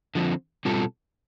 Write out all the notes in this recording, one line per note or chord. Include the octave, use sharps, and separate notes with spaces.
D3 F3 C4
B2 G3 C4 F4 A4